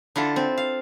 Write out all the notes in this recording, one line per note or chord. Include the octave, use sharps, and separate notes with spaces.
D3 E4 F4 A4
C4
F5